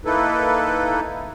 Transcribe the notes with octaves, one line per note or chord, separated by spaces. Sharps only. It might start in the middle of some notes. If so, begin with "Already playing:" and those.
A#3 D#4 E4 A4 B4